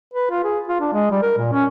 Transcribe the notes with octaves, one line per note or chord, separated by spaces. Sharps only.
B4
F4
G#4
F4
D4
G#3
G3
A#4
A#2
C#4